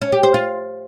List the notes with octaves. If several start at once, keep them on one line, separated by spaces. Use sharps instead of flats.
C#4
G4
C5
F4